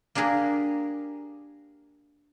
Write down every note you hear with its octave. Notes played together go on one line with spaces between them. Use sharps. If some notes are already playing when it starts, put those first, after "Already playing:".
A#3 D4 G4 G#4 A#4